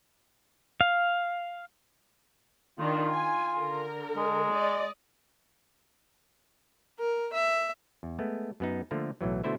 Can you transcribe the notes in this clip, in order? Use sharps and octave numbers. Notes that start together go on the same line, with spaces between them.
F5
D#3 D4 F4
G#5
D3 A#4
G#3
D5 D#5
A#4
E5
E2
G#3 A3 B3
F#2 B3 D#4
D3 F3 A3 A#3
B1 A2 E3 F#3
B2 D3 A3 E4 C5 E5